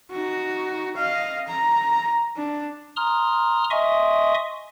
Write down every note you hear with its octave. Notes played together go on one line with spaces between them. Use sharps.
D#4 F#4
D#5 F5
A#5
D4
A#5 C6 D#6 F6
D#5 E5 G#5 C6 C#6 D#6